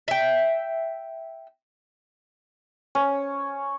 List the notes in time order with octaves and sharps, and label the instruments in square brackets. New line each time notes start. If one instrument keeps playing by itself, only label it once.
[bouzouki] E5 G5
[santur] C#4